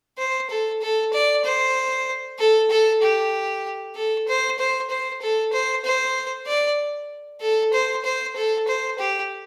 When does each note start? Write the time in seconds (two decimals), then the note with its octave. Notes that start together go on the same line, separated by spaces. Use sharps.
0.18 C5
0.50 A4
0.82 A4
1.13 D5
1.44 C5
2.39 A4
2.70 A4
3.02 G4
3.95 A4
4.28 C5
4.59 C5
4.90 C5
5.22 A4
5.52 C5
5.85 C5
6.47 D5
7.41 A4
7.73 C5
8.04 C5
8.36 A4
8.68 C5
8.99 G4